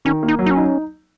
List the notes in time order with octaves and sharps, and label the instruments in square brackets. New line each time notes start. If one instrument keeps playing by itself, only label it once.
[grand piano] D#3 [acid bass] C#4
[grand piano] A#3
[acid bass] D#4
[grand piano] F#3
[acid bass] D#4
C#4
[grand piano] D#4